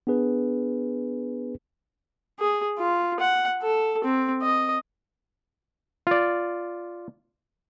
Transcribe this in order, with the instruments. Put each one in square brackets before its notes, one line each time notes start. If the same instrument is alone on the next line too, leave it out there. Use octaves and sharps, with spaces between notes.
[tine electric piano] B3 D4 G#4 B4
[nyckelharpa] G#4
F4
F#5
A4
C4
D#5
[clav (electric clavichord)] F4 D5